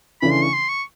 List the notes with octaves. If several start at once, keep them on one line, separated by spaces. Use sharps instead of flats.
C#3 E3 A3 D4 B5
C6
C#6
C6
C#6